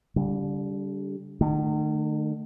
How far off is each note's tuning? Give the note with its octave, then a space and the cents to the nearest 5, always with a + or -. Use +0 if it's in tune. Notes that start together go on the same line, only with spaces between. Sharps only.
D3 -35 G3 +0
D#3 -45 A3 +0